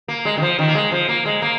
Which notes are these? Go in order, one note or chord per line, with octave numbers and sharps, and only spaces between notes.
A#3
G#3
D#3
F3
D#3
A#3
G#3
F3
A#3
G#3
A#3